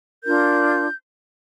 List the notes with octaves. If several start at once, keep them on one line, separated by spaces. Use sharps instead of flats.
D4 F4 A#4 G6